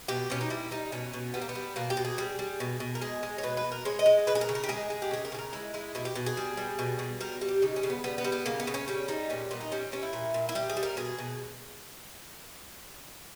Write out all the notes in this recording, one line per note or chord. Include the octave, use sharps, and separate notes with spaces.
B2 G4
B2 C#4
D#4
G3 E4
G3 D#4
B2 C#4
B2
G3 B3
A#3
B3
G3
B2 A#3
G4
B2
G#4
G3
G3
B2
B2
A#4
G#3 G#4
G#3
C#5
B2 B4
B4
B2
A#4
G#3 C#5
D#5
G#3
C#3 B4
G#4
A#4
C#3
A#4
G4
G#3 G#4
G#3
G4
C#3 G#4
A#4
C#3 G#4
A#4
G#3 E4
G#3 E4
B2 E4
G4
B2
G#4
G3
G3
B2
B2
G3 A#4
G3
G4
C#3 D#4
C#4
C#3
B3
G3 B3
B3
G3
B3
C#3 A#3
B3
C#3
C#4
G3 C#4
G3 D#4
A#2 C#4
A#2 B3
D#4
G3 C#4
G3 C#4
E4
A#2
A#2
E4
G3 G4
G#4
G3
A#4
B2 G#4
B2